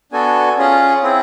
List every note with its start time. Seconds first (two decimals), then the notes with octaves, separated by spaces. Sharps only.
0.12 B3 D4 F#4 A4 G#5
0.58 C#4 F4 G#4
1.03 C4 E4 G#4